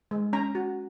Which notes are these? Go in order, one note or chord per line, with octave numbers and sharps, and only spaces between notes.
G#3
C#4 A#5
F#4